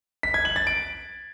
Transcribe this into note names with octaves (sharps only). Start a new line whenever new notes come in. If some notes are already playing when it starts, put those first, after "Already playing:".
B6
G#6
F#7
A6
D7